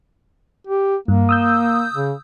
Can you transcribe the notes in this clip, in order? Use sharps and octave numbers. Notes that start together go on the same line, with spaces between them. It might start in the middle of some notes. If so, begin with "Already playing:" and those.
G4
G2 A#3
D#6 E6 G6
C#3